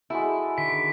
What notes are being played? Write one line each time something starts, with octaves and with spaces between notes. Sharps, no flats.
G#3 E4 F#4 A4
D3 D#3 B6